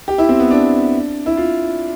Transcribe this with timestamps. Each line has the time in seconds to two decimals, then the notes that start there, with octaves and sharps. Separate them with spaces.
0.08 G4
0.18 E4
0.29 C4
0.40 B3
0.51 D4
1.26 E4
1.37 F4